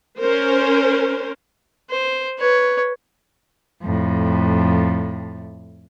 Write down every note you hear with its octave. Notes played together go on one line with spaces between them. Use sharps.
C#4 A#4 C5
C5
B4 C#5
F2 A2